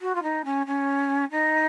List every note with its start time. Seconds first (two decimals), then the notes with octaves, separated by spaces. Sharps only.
0.01 F#4
0.15 F4
0.22 D#4
0.44 C#4
0.66 C#4
1.31 D#4